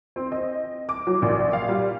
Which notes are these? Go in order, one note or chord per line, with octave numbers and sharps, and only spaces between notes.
C4
D#5
D6
F#3
A#1
F5
G3